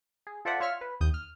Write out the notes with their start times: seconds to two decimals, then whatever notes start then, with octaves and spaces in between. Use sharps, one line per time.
0.27 G#4
0.45 F4 A4 C5 D5 E5 F#5
0.60 F4 C#5 E5 C#6 E6 F6
0.81 B4
1.01 D#2 D#6 G6
1.14 F6